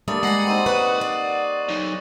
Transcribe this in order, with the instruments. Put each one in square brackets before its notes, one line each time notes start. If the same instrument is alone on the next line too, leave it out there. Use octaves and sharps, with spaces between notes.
[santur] G3 A#3 D4 [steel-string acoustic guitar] A3 [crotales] D#6 A6
[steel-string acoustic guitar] G#3 G#5 [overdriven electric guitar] F#5 [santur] A#5 [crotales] A#6 C7 F#7
[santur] C4 D#4 C5 [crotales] D#7
[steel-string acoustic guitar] B4 [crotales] C#6 F#6
[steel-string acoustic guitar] D5
[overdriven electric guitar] F#3 D#4